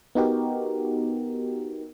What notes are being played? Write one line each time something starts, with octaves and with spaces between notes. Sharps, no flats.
B3 D#4 F#4 G4 A#4